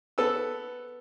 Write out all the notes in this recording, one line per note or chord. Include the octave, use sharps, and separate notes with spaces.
B3 A4 B4 E6